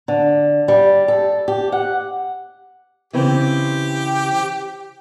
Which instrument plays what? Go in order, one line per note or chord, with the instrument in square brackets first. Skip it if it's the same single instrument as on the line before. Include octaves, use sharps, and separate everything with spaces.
[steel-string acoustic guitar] D3
G3
A4
G4
F#5
[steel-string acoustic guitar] C#3 E3 C4 [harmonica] G4